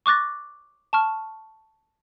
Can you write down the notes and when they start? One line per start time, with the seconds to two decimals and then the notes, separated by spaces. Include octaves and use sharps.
0.06 C#6 D6 F#6 A6 A#6
0.93 A5 C#6 F6